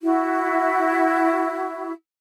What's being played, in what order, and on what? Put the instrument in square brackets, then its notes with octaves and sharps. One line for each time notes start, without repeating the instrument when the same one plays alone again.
[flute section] E4 F#4